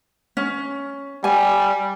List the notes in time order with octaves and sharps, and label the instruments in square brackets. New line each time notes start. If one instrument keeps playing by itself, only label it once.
[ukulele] C#4
[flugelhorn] G3 [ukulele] G#5